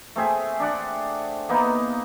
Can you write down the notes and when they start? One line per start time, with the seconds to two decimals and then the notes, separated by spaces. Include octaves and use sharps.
0.16 A3 C4 G#4 E5
0.60 D4 D5 F#5
1.49 A#3 B3 D#4